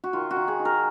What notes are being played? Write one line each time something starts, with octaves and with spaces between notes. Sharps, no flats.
F#4
D#3 F4
F#4
D#3
G#4
D#4
A#4